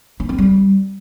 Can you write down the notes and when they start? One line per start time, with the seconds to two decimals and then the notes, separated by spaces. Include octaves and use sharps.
0.20 C#4
0.29 C4
0.38 G3